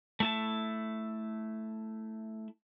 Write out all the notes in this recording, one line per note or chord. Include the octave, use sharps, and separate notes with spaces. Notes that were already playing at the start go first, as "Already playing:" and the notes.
A3 E4 A5